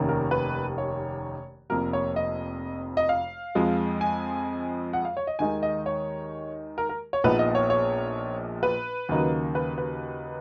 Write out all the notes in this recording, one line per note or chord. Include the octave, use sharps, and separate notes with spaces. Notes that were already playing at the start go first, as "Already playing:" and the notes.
Already playing: F1 D#2 D#3 A#3 C#4
A#4
B4
C#5
F1 F2 F3 A#3 A#4
C#5
D#5
D#5
F5
F2 F3 G#3
G#5
F#5
F5
C#5
D#5
D#2 D#3 G#3 D#4 G#5
D#5
C#5
A#4
A#4
C#5
A#1 A#2 F3 B3 D#4 B4
D#5
C#5
C#5
B4
D#2 C#3 F#3 A#3 D#4
B4
B4